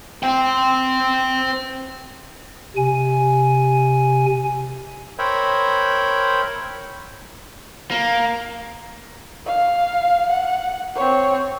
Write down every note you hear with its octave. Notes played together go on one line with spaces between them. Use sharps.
C5 G5
C3 G#5
A#4 C5 C#5 E5 G5 B5
A#3
F5
F#5
C4 C#5